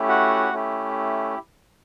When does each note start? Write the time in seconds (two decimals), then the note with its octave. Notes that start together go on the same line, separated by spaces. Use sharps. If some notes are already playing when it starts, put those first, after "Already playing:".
Already playing: A3 C#4 E4 G4
0.08 F#4 F#5
0.52 A3 C#4 E4 G4